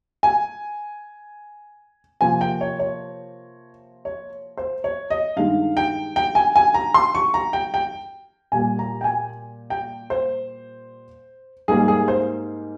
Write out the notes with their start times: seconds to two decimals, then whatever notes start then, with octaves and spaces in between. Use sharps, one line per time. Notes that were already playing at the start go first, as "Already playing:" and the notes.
0.23 G#5
2.21 C3 F3 A#3 G#5
2.41 G5
2.61 C#5
2.80 C#5
4.05 C#5
4.57 C5
4.84 C#5
5.10 D#5
5.36 G2 D#3 G#3 F5
5.77 G5
6.16 G5
6.35 G#5
6.56 G#5
6.74 A#5
6.94 C6
7.15 C#6
7.34 A#5
7.53 G5
7.74 G5
8.52 A#2 G3 A#3 G#5
8.79 A#5
9.01 G5
9.04 G#5
9.70 G5
10.10 C5
11.68 G#2 G3 A#3 G#4
11.88 G#4
12.08 C5